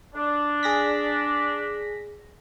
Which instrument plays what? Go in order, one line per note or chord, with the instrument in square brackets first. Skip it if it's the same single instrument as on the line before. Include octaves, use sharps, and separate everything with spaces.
[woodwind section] D4
[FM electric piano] G#4 A#6 B6